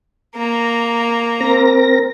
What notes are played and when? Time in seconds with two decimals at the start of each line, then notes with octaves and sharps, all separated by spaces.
0.36 A#3 A#5
1.40 C4 A#4 A#6